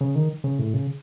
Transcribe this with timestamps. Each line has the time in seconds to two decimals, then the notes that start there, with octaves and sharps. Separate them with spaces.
0.01 C#3
0.15 D#3
0.44 C#3
0.59 A2
0.74 C#3